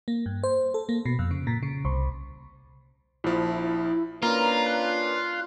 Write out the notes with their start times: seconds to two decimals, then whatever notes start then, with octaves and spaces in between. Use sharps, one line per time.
0.08 A#3
0.26 G2
0.44 C5
0.74 A4
0.89 A#3
1.05 B2
1.19 F2
1.31 C#3
1.47 A#2
1.63 C#3
1.85 C2
3.24 A#1 F3 E4
4.23 A#3 C#4 D4 F4 B4 A#5
4.66 F#6